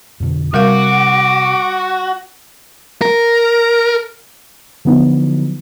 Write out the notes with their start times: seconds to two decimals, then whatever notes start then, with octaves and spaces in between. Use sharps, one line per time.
0.20 F2 B2 D3
0.54 C3 G3 F#4 A#4 F5 D6
3.02 A#4
4.85 D3 F3 F#3 B3 D#4